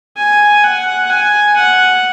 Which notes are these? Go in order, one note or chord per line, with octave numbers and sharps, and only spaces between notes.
G#5
F#5
G#5
F#5